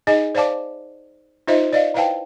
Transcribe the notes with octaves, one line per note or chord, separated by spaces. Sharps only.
D#4 G#4 D#5 G#5
C5 D5 F5 A5 D6
D#4 F4 C5 D#5 E5
D5 D#5 F5
E4 B4 C5 F5 G5 A5